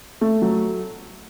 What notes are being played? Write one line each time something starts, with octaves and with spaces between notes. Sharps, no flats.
A3
F#3